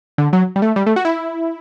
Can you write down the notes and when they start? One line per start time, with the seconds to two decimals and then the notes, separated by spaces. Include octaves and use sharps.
0.18 D3
0.33 F#3
0.56 G3
0.62 A3
0.76 G3
0.86 A3
0.96 F#4
1.05 E4